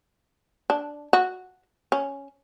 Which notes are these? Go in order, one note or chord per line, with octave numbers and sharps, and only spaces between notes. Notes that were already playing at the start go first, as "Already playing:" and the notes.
D4
F#4
C#4